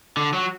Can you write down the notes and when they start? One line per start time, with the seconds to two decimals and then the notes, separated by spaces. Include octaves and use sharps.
0.17 D3
0.33 F#3